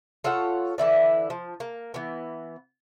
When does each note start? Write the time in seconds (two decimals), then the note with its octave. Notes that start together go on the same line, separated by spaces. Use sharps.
0.24 F4 A4 C#5 F#5
0.78 D3 E3 E4 D5
1.30 F3
1.60 A#3
1.94 E3 B3